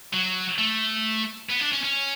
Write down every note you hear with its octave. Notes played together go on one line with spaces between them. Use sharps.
F#3
A3
B3
D4
C#4
C#4